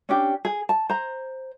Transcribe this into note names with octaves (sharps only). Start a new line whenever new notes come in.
C#4 D4 G4
G#4
A5
C5 A#5